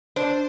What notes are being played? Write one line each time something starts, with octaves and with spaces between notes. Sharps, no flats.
D4 C5